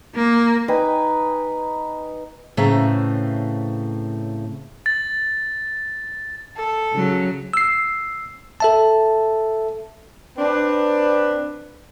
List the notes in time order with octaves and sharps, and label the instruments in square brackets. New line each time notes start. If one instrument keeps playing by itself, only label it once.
[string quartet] A#3
[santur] D#4 B4 G5 G#5
[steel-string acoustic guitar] A2 C#3 A3 C4 B4 A#5
[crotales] A6
[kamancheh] A4
[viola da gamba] C#3 F#3
[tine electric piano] E6 C7
A4 E5 A5
[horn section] C4 D4 B4